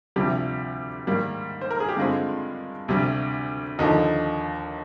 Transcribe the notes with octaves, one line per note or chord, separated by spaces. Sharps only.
D2 C3 F3 G3 G4
G#2 D#3 G3 A#3
C5
A#4
G#4
G4
G2 D3 G#3 C4 F4
D2 C3 G3
D#2 D3 F3 D#4